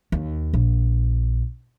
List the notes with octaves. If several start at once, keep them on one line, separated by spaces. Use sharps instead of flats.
D#2
A#1